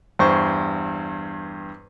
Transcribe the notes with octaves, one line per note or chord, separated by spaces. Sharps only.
E2 G2 C5 C#6